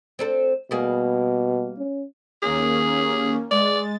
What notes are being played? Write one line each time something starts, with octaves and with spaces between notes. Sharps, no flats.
C4 D4 A4
B2 G3 A#3 G#4
C#4
D#2 A#3 C#4 G#4
G#3 D5 A6